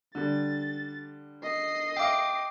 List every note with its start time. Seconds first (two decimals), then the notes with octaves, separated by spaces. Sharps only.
0.15 D3 G3 A6
1.43 D#5 C7
1.97 E5 F5 G5 D6